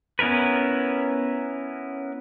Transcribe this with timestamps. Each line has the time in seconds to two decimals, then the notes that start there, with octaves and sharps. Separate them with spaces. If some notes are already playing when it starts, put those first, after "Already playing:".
0.19 B3 C#4 E4 A#4 B4